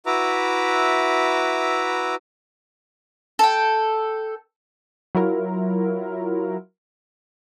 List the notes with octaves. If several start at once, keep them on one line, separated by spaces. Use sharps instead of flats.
E4 F#4 B4 E5 A#5 D6
A4 G5
F#3 E4 F4 A#4